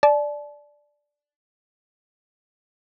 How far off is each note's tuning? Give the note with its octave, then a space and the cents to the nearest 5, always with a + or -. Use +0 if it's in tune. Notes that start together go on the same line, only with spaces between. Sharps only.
D5 +0 A5 -35